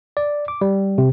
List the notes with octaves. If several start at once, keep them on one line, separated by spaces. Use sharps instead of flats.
D5
D6
G3
C3